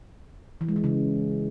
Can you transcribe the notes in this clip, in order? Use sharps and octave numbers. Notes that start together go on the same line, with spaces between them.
E3
G#3
E3
C#3